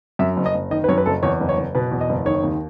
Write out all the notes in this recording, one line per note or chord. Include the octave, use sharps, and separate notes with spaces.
F#2 E5
F#1
D#5
F#1
D#3 D#5
B4
F#2 C#5
B4
F#1 A4
E2 C#5
F#1
C#5
F#1
B2 B4
E2
D#5
F#1
D#3 C#5
D#2